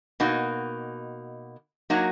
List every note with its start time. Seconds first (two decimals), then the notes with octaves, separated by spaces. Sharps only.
0.20 B2 A#3 D#4 F#4
1.90 F#3 A#3 D#4 F#4